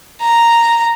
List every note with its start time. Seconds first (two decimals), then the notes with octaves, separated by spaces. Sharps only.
0.21 A#5